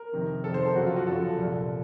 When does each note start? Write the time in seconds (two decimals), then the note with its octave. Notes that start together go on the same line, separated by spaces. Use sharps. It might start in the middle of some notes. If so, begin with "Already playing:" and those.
Already playing: A#4
0.13 F2 C3 D#3
0.44 F2 C3 D#3 A4
0.54 C5
0.65 A4
0.75 F#2 C#3 F3 F#4
0.86 F4
0.96 F#4
1.07 F#2 C#3 F3 A4
1.38 C2 A#2 F3